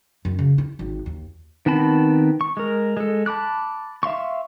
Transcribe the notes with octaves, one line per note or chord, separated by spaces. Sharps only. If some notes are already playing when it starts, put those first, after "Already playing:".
F#2
C#3
E4
G#1
D#2
D#3 B3 C4 A5 B5
C#6
G#3 A#4
G#3 A4
A5 B5 D6 F#6
E5 F5 C6 C#6